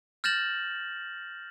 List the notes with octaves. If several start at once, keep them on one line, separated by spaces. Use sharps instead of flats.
F6 G6 A6 A#6 E7 F#7